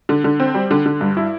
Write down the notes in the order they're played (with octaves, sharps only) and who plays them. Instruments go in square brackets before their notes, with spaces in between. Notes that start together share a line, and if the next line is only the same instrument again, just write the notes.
[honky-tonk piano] D3
D3
C4
G3
D3
D3
G2
E4